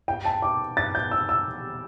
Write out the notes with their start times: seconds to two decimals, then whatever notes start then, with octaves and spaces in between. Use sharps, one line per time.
0.08 G5
0.25 A5
0.42 D6
0.77 A6
0.95 G6
1.11 E6
1.29 E6